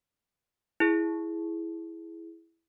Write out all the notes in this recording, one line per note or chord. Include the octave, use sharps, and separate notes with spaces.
E4 G#4